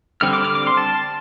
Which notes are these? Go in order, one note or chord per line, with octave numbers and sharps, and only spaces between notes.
D3 G3 C4 F6
D6
F6
D6
C6
A5